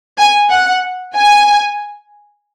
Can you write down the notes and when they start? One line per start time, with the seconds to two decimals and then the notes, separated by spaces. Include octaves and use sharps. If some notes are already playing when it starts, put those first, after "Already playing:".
0.18 G#5
0.50 F#5
1.15 G#5